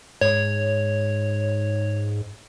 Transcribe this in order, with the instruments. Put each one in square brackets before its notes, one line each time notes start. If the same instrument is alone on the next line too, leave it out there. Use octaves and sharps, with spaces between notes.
[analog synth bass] G#2 [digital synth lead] C#5